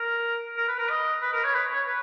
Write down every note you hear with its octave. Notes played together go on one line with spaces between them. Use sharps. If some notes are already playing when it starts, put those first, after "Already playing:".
Already playing: A#4
A#4
B4
A#4
D#5
B4
A#4
C#5
B4
C#5
B4